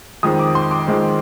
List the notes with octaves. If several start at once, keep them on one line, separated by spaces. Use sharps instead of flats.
F2 D#3 G#3 C4 D#6
D6
C6
D6
F2 D#3 G#3 C4